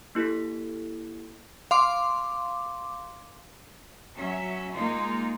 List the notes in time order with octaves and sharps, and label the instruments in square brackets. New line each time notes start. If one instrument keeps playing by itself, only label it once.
[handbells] A#3 E4 G4 A4 B6
[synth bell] F5 C6 D6
[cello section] F#3 C#4 E5
G#3 A#3 D#4 F4